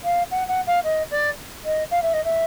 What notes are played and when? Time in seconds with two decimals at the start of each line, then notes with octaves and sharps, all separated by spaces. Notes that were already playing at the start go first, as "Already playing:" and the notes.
0.04 F5
0.31 F#5
0.48 F#5
0.67 F5
0.84 D#5
1.11 D5
1.65 D#5
1.91 F5
2.02 E5
2.13 D#5
2.24 E5